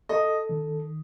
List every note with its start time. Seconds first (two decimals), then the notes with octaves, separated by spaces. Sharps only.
0.09 A4 D#5
0.49 D#3